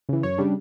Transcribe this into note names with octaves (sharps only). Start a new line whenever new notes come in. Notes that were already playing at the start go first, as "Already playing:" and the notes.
C#3 E3
F#2 C#5
C#3 G3 D4